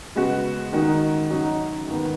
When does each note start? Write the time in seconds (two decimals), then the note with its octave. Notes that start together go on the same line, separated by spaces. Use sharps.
0.16 C#3 G#3 B3 F#4
0.73 D#3 G#3 D#4 F#4
1.30 F#2 F#3 D#4 F#4
1.87 G#2 D#3 B3